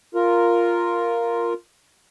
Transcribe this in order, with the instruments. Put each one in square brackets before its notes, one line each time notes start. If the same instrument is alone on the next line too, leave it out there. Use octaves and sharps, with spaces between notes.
[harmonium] F4 A#4